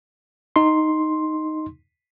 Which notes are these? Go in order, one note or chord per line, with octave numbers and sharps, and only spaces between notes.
D#4 C6